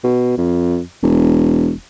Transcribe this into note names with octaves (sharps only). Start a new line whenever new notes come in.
B2
F2
E1